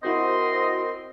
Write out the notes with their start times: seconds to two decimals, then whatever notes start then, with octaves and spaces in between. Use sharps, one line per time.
0.03 C4 E4 F#4 A#4 C5 D#5 C6